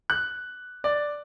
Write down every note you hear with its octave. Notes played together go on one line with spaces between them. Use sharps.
F#6
D5